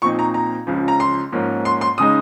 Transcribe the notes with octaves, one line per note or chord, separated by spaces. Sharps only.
A#2 F3 C4 D#4 C#6
A#5
A#5
C#2 C#3 F3
A#5
C6
G#2 F3 A#3 C#4
C6
C6
C#3 G#3 D#4 D#6